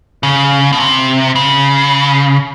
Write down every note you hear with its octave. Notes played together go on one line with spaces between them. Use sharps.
C#3
B2
C3
C#3